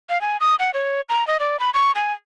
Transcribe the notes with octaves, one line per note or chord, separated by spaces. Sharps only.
F5
G#5
D#6
F#5
C#5
A#5
D#5
D5
B5
C#6
G#5